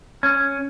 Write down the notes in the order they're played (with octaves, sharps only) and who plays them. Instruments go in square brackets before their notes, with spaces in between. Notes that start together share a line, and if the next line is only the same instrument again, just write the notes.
[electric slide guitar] C#4